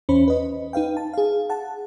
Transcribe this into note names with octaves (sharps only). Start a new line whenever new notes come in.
E2 C#4 C5 B5
B4 D#5
D#4 B4 F5 G5
A5
G#4 F5
F#5 A5